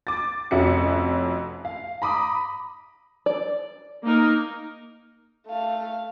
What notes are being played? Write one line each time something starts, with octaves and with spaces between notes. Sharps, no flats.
D6 A6
F1 F2 C#4 F#4 E5 C#7
F5
A#5 B5 D6 D#6
D5
A#3 D#4 A#4
A3 F5